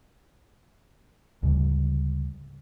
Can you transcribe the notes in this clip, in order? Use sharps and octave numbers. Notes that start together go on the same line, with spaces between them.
D2 G#2 C#3 G3